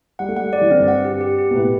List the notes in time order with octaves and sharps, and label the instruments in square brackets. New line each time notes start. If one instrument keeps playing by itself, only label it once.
[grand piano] G3 [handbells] F#5
[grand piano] A3
[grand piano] G3 [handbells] F#5
[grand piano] A3
[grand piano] G3 [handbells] D5
[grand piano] E3
[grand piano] D3 [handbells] C4
[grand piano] G2
[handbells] F#5
G4
G4
G4
[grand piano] B2
[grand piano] A2 [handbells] B4